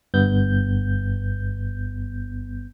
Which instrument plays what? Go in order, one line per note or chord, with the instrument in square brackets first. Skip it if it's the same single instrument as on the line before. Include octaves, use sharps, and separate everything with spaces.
[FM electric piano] G1 G2 B3 G6